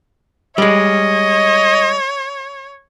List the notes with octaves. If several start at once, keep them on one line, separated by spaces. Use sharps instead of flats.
G3 G#3 C#5 D#5